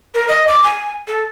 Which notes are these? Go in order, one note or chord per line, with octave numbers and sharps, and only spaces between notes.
A#4
D#5
D6
G#5
A4